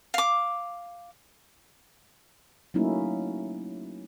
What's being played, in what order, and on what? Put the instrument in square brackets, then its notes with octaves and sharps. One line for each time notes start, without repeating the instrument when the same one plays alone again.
[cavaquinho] F5 D6
[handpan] F#3 A3 A#3 C#4 D#4 E4